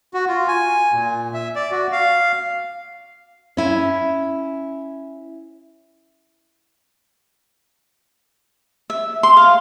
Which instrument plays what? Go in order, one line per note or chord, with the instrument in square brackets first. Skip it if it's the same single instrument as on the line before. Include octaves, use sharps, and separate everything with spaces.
[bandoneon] F#4
F4
G#5
A#2
E5
D5
F#4
F5
[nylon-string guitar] C#4 E4
[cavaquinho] E5
C6
F5